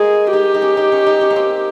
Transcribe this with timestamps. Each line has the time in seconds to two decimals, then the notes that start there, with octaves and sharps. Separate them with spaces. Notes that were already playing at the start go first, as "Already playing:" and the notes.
Already playing: G#3 A#3 G#4
0.33 D#4 G4
0.54 D#4
0.62 C#4
0.77 D#4
0.92 C#4
1.06 D#4
1.21 C#4
1.30 A#3
1.36 C4